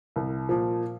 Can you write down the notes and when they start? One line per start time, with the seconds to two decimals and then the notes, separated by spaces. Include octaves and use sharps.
0.16 C2
0.49 A#2 F3